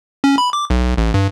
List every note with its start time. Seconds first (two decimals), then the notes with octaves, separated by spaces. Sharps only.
0.24 C#4
0.38 B5
0.53 D6
0.70 B1
0.98 A1
1.14 G2